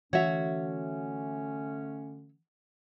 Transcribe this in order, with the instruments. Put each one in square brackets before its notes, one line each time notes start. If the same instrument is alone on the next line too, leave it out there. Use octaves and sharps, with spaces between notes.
[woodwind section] D3 A3 C#4 [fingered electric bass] E3 [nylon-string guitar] F#4 [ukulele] C#5 E5